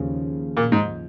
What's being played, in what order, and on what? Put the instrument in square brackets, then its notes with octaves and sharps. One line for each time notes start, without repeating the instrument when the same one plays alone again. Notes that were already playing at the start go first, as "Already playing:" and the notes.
Already playing: [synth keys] D#2 C#3 F3
[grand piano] A#2
G#2